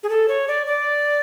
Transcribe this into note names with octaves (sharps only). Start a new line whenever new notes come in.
G#4
A4
C#5
D5
D5